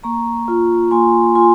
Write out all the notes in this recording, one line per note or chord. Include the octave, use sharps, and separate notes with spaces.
A#3 A#5 C#6
F4
A#3 G#5 C6
F4 G#5 C6